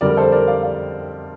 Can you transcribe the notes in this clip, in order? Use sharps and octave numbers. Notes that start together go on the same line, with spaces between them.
F2 D3 G3 A#4 D5
A4 C5
A#4 D5
D5 F5
D5 F5